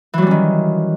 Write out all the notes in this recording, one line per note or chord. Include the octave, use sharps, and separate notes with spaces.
D#3 E3 F#3 G3 C#4